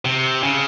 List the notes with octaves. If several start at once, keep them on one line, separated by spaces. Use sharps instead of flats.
C3
C#3